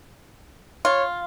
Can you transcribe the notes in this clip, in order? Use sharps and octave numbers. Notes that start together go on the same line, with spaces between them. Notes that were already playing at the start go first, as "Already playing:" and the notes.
F4 C#5